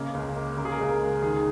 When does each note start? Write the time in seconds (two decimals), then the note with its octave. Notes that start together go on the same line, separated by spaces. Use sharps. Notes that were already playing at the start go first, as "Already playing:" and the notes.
Already playing: C#3 A#3 D#5
0.14 C#2
0.36 A#3
0.57 C#3 A#4
0.65 G#4
0.72 A#4
0.80 C#2
0.90 A#4
1.00 G#3
1.23 D#3 G#4